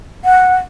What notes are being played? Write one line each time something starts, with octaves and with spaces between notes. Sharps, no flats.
F#5